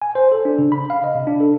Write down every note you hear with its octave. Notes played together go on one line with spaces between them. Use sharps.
G#5
C5
A4
D4
C#3
B5
F5
D#5
C3
D4
A4